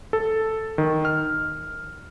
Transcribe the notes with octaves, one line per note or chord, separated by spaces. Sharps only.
A4
D#3
F6